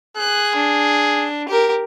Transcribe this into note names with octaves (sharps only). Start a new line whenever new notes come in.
G#4 F#6
D4
G4 A#4